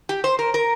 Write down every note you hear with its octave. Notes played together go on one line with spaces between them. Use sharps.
G4
C5
A#4
A#4